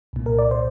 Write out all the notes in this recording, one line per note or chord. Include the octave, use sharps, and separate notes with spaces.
C2 A#2
A#4
D5
C5